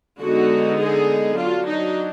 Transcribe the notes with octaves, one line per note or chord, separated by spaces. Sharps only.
D3 G#3 B3 D#4 F#4
G#4
F#3 D4 F4
D#4